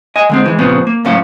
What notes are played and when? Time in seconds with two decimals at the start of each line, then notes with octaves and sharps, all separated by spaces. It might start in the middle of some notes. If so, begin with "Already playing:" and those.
0.16 D#5 G#5
0.29 D3 G#3 C4
0.45 E3 G#3
0.59 A#2 C#3 F3 B3 C4
0.87 A#3
1.05 C#2 F#2 A2 C#4 F5